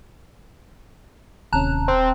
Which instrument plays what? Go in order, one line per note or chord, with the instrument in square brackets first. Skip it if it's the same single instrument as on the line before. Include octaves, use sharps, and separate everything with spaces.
[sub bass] D#1 [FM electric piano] D#2 C3 C#4 [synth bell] A5 A#5 F#6
[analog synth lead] C4